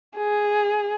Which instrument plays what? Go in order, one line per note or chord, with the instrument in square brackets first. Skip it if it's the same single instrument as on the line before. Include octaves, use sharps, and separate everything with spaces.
[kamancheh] G#4